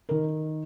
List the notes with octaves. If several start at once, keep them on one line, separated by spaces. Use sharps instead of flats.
D#3 A#4